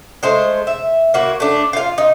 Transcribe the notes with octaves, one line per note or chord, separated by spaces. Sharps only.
G#3 A3 C5
E5
A#3 E4 F#4
A3 D4
F4 F5
D#4